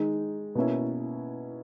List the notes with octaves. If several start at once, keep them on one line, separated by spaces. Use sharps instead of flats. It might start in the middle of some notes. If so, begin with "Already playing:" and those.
Already playing: D#3 G#3 D#4
B2 A#3 C#4 E4